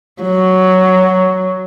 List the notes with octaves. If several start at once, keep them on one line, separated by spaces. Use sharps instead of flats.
F#3